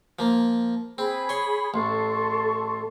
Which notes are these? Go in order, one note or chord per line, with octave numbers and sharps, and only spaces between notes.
F3 A#3
C4 G#4 B5
C#5 C6
A1 A4 C6 C#6